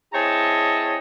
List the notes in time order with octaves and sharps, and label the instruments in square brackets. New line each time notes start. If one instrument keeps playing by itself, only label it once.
[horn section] C4 E4 G#4 C#5 D#5 A5